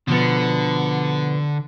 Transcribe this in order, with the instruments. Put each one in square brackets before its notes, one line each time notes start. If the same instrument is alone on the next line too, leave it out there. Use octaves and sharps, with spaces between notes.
[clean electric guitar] B2 F3 B3 [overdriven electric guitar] D3